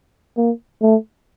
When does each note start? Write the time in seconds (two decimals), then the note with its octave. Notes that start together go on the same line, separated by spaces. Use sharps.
0.37 A#3
0.82 A3